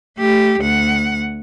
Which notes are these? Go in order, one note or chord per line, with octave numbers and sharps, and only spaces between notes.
A3 G4
D2 F#5